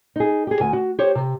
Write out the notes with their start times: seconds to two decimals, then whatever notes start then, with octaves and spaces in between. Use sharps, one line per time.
0.16 D#4 G#4
0.47 G4 G#4
0.60 D2 G#5
0.73 F#4
0.99 G4 C5 C#5
1.15 C3